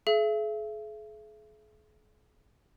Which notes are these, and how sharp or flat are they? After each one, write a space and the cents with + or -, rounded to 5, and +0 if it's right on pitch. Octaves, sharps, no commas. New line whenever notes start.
G#4 +45 E5 +35